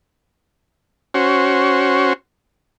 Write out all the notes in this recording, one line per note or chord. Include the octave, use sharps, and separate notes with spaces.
C#4 F#4 C5